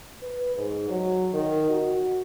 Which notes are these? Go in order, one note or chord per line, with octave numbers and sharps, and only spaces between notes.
B4
G#2
F#3
D#3
F#4